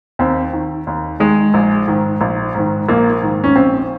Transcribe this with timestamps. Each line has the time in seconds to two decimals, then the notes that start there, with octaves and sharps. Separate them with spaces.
0.19 D#2 C4
0.53 D#3
0.87 D#2
1.20 D#3 G#3
1.54 A#1
1.88 G#2 D#3
2.21 A#1
2.55 G#2 D#3
2.89 A#1 A#3
3.22 G#2 D#3
3.44 C#4
3.56 A#1 C4